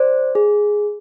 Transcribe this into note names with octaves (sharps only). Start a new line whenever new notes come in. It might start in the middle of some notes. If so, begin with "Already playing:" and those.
Already playing: C5 D5
G#4